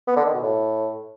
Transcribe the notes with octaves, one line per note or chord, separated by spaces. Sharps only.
B3
D3
D#3
B2
A2